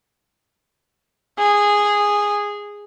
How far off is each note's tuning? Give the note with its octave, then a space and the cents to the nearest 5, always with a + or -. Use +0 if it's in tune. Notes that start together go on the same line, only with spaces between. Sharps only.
G#4 -10